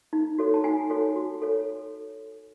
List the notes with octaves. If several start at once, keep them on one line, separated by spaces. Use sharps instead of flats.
D#4
F#4 A4 C#5
A5
D#4 F#5 G#5
F#4 A4 C#5
F#4
A4 C#5